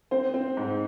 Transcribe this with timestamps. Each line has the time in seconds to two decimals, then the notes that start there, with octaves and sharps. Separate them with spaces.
0.11 C4 C5
0.34 C4
0.57 G#2